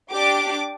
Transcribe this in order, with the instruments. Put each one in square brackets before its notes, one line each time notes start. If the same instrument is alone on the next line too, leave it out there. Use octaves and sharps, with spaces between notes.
[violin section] D4 G4 D6